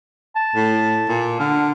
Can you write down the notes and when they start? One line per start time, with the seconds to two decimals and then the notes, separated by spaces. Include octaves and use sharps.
0.36 A5
0.55 A2
1.09 A#2
1.40 D3 F6